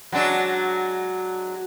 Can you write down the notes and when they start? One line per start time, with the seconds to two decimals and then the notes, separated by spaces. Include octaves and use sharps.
0.12 F#3 G#3 D4